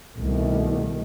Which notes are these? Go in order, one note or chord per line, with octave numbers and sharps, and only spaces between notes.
C2 B2 D#3 A3